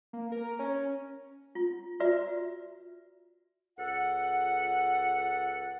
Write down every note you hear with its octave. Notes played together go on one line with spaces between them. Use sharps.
A#3
A#4
C#4
F4
F4 F#4 B4 D5 E5
C#2 A4 F#5